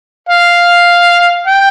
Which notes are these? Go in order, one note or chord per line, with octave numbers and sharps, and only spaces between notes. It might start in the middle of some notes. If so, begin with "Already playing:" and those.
F5
G5